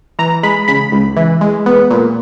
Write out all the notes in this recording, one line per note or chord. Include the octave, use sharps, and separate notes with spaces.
E3 A#5
G#3 B5
C#3 B5
C#2
E3
G#3
B3
A#2